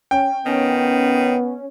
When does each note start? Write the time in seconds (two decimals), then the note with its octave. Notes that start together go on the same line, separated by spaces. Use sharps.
0.11 C#4 G5
0.46 D#3 B3 C#4